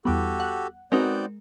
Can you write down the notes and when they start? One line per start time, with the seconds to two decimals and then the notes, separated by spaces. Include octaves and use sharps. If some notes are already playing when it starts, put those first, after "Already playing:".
0.05 E2 G3 B3 F#4 G4 A4
0.40 F#5 F#6
0.92 G#3 B3 C4 D#4 F#4 A#4 D5 G6